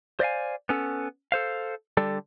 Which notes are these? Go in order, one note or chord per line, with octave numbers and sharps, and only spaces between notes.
C5 D5 D#5 F5 G#5
B3 C#4 A4
A4 C5 F5
D3 G3 D4 A4